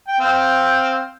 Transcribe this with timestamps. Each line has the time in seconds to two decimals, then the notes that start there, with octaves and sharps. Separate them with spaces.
0.07 G5
0.20 C4 F5 G5